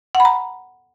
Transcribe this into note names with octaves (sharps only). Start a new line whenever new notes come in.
F#5
B5
A#5